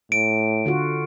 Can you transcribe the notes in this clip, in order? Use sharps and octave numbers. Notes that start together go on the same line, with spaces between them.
A2 D7
D3 F4 F#4